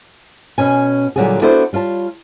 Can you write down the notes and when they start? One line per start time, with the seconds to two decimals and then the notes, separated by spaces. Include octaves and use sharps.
0.58 B2 C#4 G#5
1.16 A#2 D3 F#3 G3 F#4 G#4
1.42 B3 D4 E4 F#4 A4 C5
1.73 G3 F4 C#5 A5